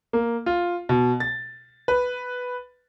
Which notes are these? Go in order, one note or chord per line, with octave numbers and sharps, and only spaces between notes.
A#3
F4
B2
A6
B4